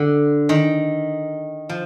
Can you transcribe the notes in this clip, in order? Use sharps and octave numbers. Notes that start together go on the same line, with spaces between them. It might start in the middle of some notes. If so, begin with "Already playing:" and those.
Already playing: D3
D#3
F3